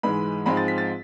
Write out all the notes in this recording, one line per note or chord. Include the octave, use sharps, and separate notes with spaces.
G#2 E3 G#3 B5
G#2 F3 G#3 C4 B5
A6
B6
A6